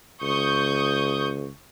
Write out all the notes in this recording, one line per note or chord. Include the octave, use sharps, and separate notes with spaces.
C#2 C#6 D#6 G6